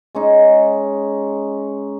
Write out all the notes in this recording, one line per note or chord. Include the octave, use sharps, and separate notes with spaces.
G#3 C#4 D#4